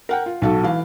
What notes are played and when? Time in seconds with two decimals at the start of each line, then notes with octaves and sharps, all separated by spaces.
0.09 A#4 F#5 G5
0.26 F4
0.42 B1 F#4 A4
0.64 E3 F5